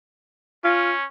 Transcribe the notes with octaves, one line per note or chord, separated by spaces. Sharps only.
C#4 F4